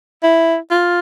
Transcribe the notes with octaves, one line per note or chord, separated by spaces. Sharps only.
E4
F4